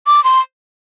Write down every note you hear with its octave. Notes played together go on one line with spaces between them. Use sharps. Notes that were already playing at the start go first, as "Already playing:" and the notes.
D6
C6